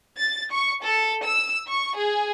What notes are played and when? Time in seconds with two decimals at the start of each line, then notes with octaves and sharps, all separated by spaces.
0.18 A6
0.51 C#6
0.84 A4
1.25 E6
1.68 C#6
1.97 G#4